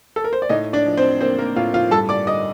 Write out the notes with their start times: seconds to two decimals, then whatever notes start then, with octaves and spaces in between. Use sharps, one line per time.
0.16 A4
0.24 A#4
0.33 C5
0.42 D5
0.49 A2 D#4 D#5
0.73 D4 D5
0.86 F3
0.97 C4 C5
1.21 A#3 C4 C5
1.39 A#3 A#4
1.56 A2 F4 F5
1.74 F4 F5
1.91 G2 A4 A5
2.09 D5 D6
2.27 D3 D#5 D#6